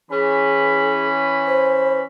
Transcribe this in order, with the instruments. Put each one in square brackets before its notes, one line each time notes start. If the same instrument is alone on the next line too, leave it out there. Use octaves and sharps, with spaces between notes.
[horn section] E3 C#4 B5 [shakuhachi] G#4
[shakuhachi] C5